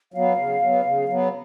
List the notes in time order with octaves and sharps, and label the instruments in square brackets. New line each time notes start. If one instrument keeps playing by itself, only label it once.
[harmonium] F#3 B3 [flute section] F5
[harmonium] C#3
F#3 B3
C#3
F#3 B3